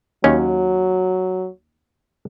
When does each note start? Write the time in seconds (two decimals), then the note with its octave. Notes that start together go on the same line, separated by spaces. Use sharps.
0.24 D#2 F#3 C#4